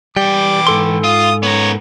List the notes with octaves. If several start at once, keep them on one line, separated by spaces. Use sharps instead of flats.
E3 G3 G5 D6
G#2 A4 C6
F4 D#6
B3 A#4 C#5